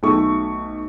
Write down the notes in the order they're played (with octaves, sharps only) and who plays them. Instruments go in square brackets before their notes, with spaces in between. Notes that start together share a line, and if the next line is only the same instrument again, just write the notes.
[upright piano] B1 A3 C#6